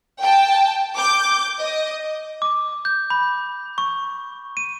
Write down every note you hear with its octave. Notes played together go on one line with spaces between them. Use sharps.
G5 A5
D6 G6
D#5
D6
G6
B5
C#6
D#7